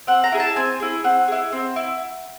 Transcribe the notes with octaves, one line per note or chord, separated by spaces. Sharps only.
C4 F#5
A#5
E4 G#4
A5
C4 G#5
E4 G#4
C4 F#5
E4 G#4
C4
E4